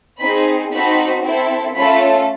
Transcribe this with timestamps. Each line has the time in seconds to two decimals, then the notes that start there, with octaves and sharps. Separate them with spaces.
0.19 C4 D#4 G#4 B5
0.72 C4 D#4 F#4 A4 B5
1.23 C4 E4 A4
1.75 A3 C#4 F4 A4 B5